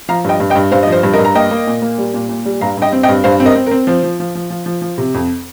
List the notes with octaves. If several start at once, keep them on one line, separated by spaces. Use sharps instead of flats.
F3 F5 A#5
G2 D#5 G5
G2
D#5 G5
G2
G2 C5 F5
F3 D#5
C5
G2
A#4 D#5
G2
A#5
A#3 D#5 G5
A#3
A#2
A#3
G3
A#2
A#2
G3
G2 F5 A#5
G2 D#5 G5
C4
D#5 G5
G2
G2 C5 F5
C4
A#4 D#5
C4
A#4
C4
F3 C5
F3
F3
F3
F3
F3
F3
C3
F2